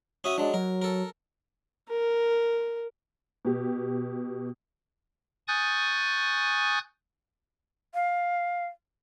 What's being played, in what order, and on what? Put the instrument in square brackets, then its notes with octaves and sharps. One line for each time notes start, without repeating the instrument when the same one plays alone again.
[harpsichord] C#4 F#4 E5 [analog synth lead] D#6
[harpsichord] F#3 G#3 [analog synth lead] D4
[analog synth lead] F#3 [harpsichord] A#4
[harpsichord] A4 A#4
[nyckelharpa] A#4
[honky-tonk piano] B2 G4
[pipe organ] G#5 C#6 D#6 F#6 G6 A6
[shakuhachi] F5